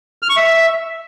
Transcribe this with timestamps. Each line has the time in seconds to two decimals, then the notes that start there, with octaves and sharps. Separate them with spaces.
0.22 F6
0.30 C#6
0.37 E5